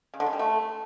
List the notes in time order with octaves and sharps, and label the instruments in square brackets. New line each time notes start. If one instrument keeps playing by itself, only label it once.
[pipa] C#3
D3
C#3
G3
A3